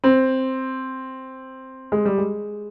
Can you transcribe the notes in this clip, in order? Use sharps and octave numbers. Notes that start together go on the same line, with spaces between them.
C4
G#3
G3
G#3